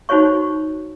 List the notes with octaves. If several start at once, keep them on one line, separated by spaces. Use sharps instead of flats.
D#4 F#4 C5 C#5 C#6